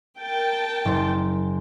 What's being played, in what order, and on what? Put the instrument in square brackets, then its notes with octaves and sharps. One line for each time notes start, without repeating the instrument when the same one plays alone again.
[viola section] A#4 G5 A5
[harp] F#1 C5